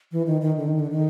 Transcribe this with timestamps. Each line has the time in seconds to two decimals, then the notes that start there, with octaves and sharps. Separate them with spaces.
0.12 E3
0.27 D#3
0.42 D#3
0.57 D3
0.68 D#3
0.79 D3
0.91 D#3